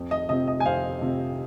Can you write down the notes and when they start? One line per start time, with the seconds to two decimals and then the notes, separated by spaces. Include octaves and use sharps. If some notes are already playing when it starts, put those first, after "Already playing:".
Already playing: F2
0.11 D#5
0.29 C3 F3 C4 D#5
0.48 D#5
0.60 G#5
0.66 F2 C5 F5
1.02 C3 F3 C4